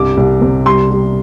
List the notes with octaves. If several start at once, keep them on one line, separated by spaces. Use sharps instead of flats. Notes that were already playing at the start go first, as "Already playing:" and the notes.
Already playing: C2 G2 D6
C2
C3
G3 C6
G3